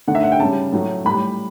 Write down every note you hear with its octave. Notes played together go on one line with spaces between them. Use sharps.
D3 A3 F#5
E5
F#5
G5
C#3 A5
G3
A2 F#3 A3
A2 G3 B5